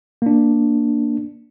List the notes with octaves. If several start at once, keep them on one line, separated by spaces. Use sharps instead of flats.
A#3 D4